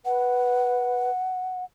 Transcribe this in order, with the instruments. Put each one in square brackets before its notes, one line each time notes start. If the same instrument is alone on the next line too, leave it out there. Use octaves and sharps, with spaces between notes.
[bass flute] B4 [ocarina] F#5